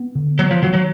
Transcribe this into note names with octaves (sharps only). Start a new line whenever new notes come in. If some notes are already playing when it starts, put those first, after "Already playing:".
Already playing: B3
D3
F#3 B3
F3
D#3 F#3
F#3